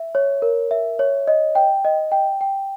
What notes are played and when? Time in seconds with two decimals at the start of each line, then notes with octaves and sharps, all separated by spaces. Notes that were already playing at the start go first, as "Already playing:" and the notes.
Already playing: E5
0.15 C#5
0.42 A#4
0.71 E5
0.99 C#5
1.28 D#5
1.55 G5
1.85 D#5
2.12 G5
2.41 G5